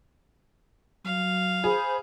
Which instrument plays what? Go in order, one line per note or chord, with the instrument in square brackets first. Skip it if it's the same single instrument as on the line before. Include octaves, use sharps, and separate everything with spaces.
[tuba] F#3 [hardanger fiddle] F5
[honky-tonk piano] G#4 [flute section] C5 B5